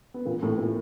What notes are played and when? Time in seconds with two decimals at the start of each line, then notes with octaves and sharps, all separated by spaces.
0.14 B3
0.25 A#2 A#3
0.43 A2 A3
0.58 A#2 A#3